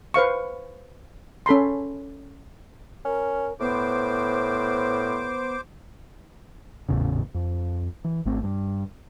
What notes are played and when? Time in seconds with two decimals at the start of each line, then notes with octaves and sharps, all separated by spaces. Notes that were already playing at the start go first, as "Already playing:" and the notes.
0.14 B4 C5 F5 C#6
1.46 C#4 A4 B5 C6
3.05 C#4 A#4
3.60 A2 B3 C5 D6
6.89 G#1 E2 A2 C#3
7.34 F2
8.04 E3
8.25 G#1 A3 C4
8.43 G2